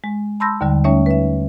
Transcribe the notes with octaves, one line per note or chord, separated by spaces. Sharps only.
G#3
A5 B5 C6 E6 G6 A#6
D#2 D3 G3
G3 A3 C#4 D#4 C#5 E5
B4 E5